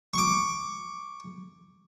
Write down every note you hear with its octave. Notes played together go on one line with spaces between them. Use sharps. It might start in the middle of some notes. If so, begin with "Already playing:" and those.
C#6 D6